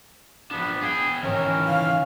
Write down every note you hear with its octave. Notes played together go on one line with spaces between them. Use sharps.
F3 B3 D4
B3 G#4 G5
D#3 E3 C#4 A#4
F5